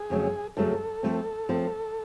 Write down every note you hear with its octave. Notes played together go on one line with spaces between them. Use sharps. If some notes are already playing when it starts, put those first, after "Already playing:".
Already playing: G#4
F2 C#3 F#3 A3
F2 C#3 F#3 A3 A4
F3 A3 C4
F3 A3 C4